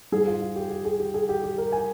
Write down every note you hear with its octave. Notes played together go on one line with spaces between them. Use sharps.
G#2 G3 G#4
F4
F4
G4
G4
G#4
G4
G#4
G4
G4
A#4
G#5